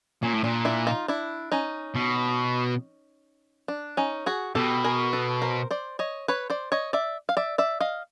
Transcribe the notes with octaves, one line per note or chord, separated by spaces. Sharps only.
A#2 C#4
A2
A#2 D4
D4 E4
D#4 F4
D4 E4
C#4 D#4
B2
D4
C#4 D#4
F#4 G#4
B2 G4 A4
G#4 A#4
A4 B4
A#4 C5
C5 D5
C#5 D#5
B4 C#5
C5 D5
C#5 D#5
D5 E5
F5
D5 E5
D5 E5
D#5 F5